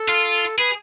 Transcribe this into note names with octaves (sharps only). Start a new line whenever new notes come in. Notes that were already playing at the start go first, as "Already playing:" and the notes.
Already playing: A4
F4
G#4 B4